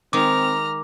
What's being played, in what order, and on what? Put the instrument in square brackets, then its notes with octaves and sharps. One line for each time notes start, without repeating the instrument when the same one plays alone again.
[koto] D#3 G#3 [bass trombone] C4 [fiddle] A#5 F6 [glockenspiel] D6